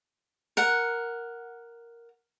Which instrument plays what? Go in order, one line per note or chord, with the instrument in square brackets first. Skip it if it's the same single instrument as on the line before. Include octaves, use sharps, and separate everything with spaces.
[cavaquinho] A#4 F#5